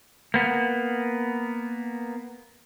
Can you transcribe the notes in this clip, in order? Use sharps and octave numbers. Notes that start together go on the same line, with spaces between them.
A#3 B3